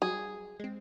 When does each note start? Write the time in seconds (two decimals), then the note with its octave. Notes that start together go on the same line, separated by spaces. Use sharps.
0.02 F#3 G3 F#4 G#4
0.60 G#3 C4